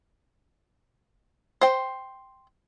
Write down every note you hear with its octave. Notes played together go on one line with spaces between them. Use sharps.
C5 G5